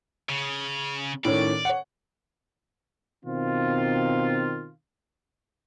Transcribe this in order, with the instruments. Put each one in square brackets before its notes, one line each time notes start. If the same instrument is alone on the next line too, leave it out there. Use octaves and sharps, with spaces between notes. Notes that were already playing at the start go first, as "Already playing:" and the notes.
[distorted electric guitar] C#3
[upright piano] A2 D#3 C#4 [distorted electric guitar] D5
[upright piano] C#5 F#5
[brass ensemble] B2 D#3 C4 F4